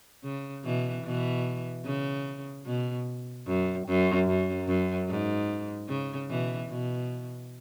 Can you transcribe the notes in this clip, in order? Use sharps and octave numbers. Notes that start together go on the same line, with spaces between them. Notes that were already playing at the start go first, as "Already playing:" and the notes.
C#3
B2 E3
B2 E3
C#3
B2
F#2
F#2
F#2
F#2
G#2
C#3
B2 E3
B2